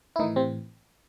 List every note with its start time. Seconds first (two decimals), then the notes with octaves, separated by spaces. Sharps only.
0.16 E4
0.19 A2 D#3 E3 D#4
0.36 C3 C4